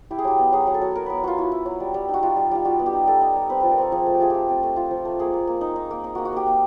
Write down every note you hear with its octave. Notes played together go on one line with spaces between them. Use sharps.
E4 G4
G#4
F#3 G4
B3
F#3 G#4
F#3
A4
F#3
F#3 A#4
B3 B4
F#3 F4
E4 F#4
E4
F#3
G3
G3
D#4
F#4
G3 F4
G3
G3 F4
G3 F#4
B3
G4
D#4
G3 A4
D#4
G3
C4 B4
F3 B4
A#4
C4 A4
F3 G#4
A3
G4
F4 G#4
A3 G4
C4
A3
F4
F3
A3
A#3 G#4
A#3
A#3
D#4
D#4
A#3
D#4
A#3 F#4
F#4
A#3 G4
A#3